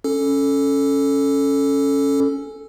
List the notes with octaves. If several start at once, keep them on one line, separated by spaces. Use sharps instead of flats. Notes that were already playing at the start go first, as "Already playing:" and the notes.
C#4 A4